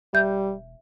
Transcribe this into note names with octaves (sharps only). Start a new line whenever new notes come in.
E1 G3 E5 G6